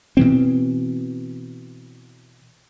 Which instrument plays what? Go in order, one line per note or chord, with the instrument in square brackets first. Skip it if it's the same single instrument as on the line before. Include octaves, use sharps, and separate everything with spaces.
[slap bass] B2 E3 C4